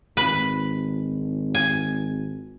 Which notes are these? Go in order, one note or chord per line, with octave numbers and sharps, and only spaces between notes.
G#1 B4
G#5